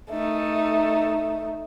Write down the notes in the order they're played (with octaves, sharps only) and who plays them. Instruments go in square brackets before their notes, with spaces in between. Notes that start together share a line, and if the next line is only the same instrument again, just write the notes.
[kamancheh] A3 D#4